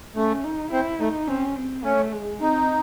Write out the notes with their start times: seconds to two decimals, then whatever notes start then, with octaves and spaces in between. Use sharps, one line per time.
0.16 A3 C#4
0.44 D#4
0.72 C4 E4
1.00 A3 D#4
1.28 C4 C#4
1.56 C4
1.84 A3 C#4
2.12 G#3
2.41 C4 D#4